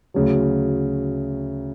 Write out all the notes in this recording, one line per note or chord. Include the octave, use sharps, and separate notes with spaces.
D2 C#3 F#3